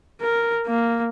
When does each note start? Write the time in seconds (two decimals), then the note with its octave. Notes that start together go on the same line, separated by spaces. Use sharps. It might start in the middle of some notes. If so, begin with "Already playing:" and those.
0.21 A#4
0.67 A#3